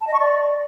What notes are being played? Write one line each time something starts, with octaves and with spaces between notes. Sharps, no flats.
A5
D#5
C#6
D5